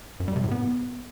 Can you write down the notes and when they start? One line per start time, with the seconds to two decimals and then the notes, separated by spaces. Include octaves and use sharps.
0.20 F#2
0.28 G3
0.36 C3
0.44 A2
0.51 B3